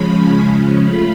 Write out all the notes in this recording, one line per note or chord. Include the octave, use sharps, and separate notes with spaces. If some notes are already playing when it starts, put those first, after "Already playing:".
Already playing: C#3 F3 G#3 C#4 B5
A3 F4 B5